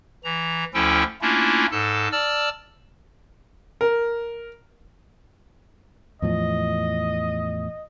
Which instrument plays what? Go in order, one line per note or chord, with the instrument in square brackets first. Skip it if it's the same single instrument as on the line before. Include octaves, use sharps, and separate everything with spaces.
[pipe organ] E3 A#5
D2 F3 C#4 E4 A4 G5
A3 A#3 C#4 D4 E4 F4
G#2 A4 A5
D5 A5 E6 F6
[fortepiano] A#4
[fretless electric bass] E2 A2 F3 [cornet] D#5